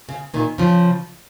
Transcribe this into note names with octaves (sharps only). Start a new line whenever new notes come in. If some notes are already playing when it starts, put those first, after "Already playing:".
C#3
A#2 D#3
C#3 F3